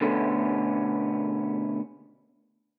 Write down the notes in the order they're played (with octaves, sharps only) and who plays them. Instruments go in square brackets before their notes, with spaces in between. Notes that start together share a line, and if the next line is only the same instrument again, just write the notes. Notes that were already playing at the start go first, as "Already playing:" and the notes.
[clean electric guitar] B2 D3 A3 B3 C#4